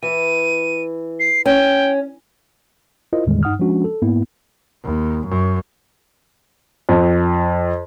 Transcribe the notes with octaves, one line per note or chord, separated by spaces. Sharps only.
E3 D#7
C7
C#4 G5
E4 F4 A#4 C5 D#5
E2 A2 D3 D#3 G3 G#3
G2 D#4 F#5 D#6 F6
F3 G#3 C#4 D4 F#4
A4
G#2 A#3 B3 E4
D#2
F#2
F2